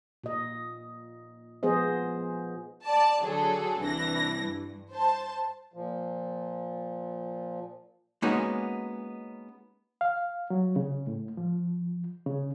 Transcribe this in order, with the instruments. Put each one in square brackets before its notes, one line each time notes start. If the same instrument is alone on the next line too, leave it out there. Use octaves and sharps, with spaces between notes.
[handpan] A#2 D#5
F3 B3 G#4 C5 D#5
[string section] D5 A5
D3 F#3 G#4 A4
C2 E3 D4 A#6
G2
C5 A5
[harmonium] A#2 F3
[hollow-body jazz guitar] G#3 A#3 B3 C#4 D#4 F#4
[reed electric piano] F5
F#3
C#3
A2
F3
C#3